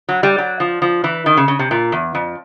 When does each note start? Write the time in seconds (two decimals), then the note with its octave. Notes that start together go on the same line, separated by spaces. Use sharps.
0.09 F#3
0.23 G3
0.38 F#3
0.60 F3
0.82 F3
1.04 E3
1.26 D#3
1.37 C#3
1.48 C#3
1.59 C3
1.71 A#2
1.92 E2
2.15 F2